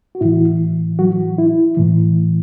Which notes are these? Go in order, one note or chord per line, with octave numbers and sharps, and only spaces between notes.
F#4
A2 E3 E4
F#3 F#4
E4
A2 E3